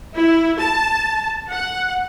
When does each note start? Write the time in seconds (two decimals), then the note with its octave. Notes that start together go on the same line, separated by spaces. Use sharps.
0.15 E4
0.59 A5
1.50 F#5